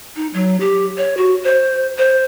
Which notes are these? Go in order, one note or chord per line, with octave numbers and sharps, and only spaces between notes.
D#4
F#3
G4
C#5
F#4
C5
C5